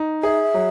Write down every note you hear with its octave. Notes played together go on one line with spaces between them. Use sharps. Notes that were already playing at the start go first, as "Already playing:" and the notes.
Already playing: D#4
G#4 E5
F#3